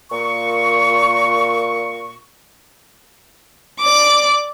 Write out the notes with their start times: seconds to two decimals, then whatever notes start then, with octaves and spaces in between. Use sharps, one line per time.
0.12 A#2 C#6
3.80 D5 D6